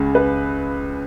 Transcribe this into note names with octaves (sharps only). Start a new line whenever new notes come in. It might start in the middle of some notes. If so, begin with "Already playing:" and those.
Already playing: C#2 C#3
B4